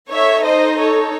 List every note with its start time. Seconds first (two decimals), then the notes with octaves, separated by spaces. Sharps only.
0.11 D#4 A4 C#5 E5
0.44 C5 D#5
0.78 A4 C#5